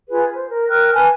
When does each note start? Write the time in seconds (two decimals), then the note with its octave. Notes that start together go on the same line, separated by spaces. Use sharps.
0.09 F4 G#4 B4
0.33 C5
0.49 A#4
0.69 A#4 G5 F6 F#6
0.94 B4 G#5 A5 F#6